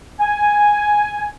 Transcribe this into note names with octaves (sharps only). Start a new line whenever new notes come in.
G#5